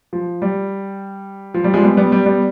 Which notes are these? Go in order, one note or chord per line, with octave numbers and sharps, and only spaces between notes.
F3
G3
F3
G3
F3 G#3
G3 B3
G3 B3
G3
G3 B3